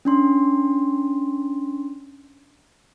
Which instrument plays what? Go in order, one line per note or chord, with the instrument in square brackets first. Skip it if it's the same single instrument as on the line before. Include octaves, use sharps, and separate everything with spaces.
[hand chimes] C#4 D4 C6